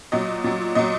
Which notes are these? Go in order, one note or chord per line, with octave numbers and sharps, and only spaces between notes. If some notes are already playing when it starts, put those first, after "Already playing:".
A#2 F#3 D#5
A#2 F#3
A#2 F#3 D#5